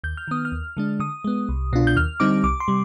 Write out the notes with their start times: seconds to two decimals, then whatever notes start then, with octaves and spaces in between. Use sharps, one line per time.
0.04 D#2 G6
0.17 F6
0.28 D#3 B3 D#6
0.45 F6
0.52 D#2
0.77 D3 G#3 D4
1.00 D3 D#6
1.24 G#3 B3
1.49 C2
1.73 B2 B3 D4 F4
1.87 G6
1.96 D#2 F6
2.20 D3 G3 C4 D#4 D6
2.44 C2 D6
2.60 C6
2.68 C3 G3